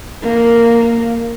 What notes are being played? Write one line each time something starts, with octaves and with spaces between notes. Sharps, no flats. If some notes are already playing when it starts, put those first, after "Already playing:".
A#3